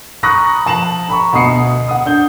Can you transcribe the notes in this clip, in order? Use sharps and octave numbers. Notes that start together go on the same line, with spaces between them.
A#5 B5 C#6 D#6 F#6 A#6
F3 A5 E7 F#7
A#5 B5 C#6
D2 B2 D#6 C7 C#7
F#5 D#6
D4 G6 G7